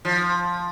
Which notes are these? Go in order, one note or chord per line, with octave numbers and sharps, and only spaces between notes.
F3